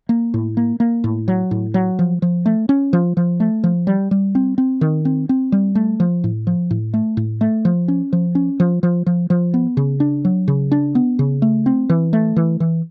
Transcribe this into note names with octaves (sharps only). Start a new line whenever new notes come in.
A#3
A2
A#3
A#3
A2
F#3
A2
F#3
F3
F3
A3
C#4
F3
F3
A3
F3
G3
G3
C4
C4
D#3
C4
C4
G3
A3
F3
A2
F3
A2
A3
A2
A3
F3
C#4
F3
C#4
F3
F3
F3
F3
B3
C#3
D4
F#3
C#3
D4
B3
C#3
A3
C4
E3
A3
E3
E3